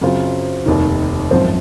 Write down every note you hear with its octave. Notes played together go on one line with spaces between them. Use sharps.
F#2 C#3 F#3 C4 F4
F1 D#2 D#3
G#1 F#2 F3 C4